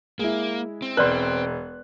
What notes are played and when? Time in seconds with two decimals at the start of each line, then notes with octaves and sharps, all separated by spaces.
0.19 G#3 A#3 E4
0.82 C4
0.97 E1 B4 D5 C6 F#6